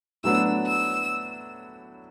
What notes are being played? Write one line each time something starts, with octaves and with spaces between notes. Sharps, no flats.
A2 F#3 B3 D4 E6
E6